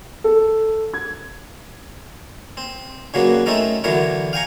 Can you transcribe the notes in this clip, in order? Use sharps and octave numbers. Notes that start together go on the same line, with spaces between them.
A4
G#6
C4
G2 C#3 F#3 A#3 B3 F#4
A3 C4 C#4 D#4 A4 A#4
D3 E3 F#3 B3 A#4 C#5
F5 G5 G#5 A#5 C#6